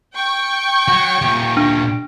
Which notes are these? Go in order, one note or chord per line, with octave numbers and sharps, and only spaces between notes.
G5 C#6
F#4 C#5
A#2 G4
D4